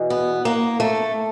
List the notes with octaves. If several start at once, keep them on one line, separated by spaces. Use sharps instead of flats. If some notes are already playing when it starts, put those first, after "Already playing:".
Already playing: E2 B2
B3
A#3
A3